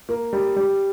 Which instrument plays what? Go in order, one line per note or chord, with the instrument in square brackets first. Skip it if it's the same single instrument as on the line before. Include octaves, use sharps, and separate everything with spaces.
[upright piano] A#3
G3
G3